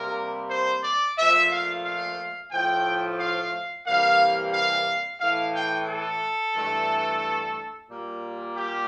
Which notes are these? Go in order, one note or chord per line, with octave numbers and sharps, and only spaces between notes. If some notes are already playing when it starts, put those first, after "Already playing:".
Already playing: C3 G3 A#3 A#4
C5
D5
A#2 F3 A3 E5
F5
F5
A2 F3 A3 G5
F5
C3 E3 G3 A#3 F5
F5
A2 E3 A3 F5
G5
A4
G2 E3 A3
A#2 G3 A#3
G4